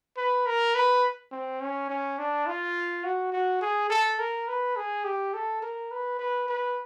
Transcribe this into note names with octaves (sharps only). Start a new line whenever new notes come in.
B4
A#4
B4
C4
C#4
C#4
D4
F4
F#4
F#4
G#4
A4
A#4
B4
G#4
G4
A4
A#4
B4
B4
B4